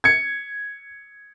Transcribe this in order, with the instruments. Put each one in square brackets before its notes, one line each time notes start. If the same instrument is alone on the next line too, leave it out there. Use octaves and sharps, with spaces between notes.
[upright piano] G#6 C#7